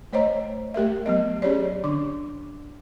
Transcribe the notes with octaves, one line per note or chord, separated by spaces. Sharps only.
A3 C5 C#5 D#5 A#5
A3 G4 A#4 E5
F#3 B3 D#5
C#4 G4 G#4 C#5 D5
D3 D4 D6